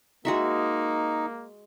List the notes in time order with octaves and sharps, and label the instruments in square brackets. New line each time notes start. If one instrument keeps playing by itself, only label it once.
[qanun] G#3 F#4 E5 [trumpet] A#3 [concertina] D#4